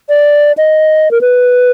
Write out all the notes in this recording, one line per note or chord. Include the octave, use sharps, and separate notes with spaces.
D5
D#5
A#4
B4